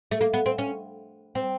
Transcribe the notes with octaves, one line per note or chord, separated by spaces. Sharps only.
A3
A#3
B3
C4
C#4
C4